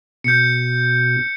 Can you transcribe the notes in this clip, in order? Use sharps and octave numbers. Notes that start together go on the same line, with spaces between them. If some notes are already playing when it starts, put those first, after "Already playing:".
B2 G6 C#7